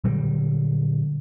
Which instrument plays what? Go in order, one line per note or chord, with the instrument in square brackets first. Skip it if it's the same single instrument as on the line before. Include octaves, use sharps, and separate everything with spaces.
[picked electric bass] A#2 D3 F#3 G3